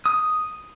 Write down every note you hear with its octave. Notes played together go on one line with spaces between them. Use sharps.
D#6